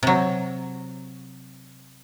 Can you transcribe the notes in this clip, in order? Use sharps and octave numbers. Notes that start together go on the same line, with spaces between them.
C3 F#3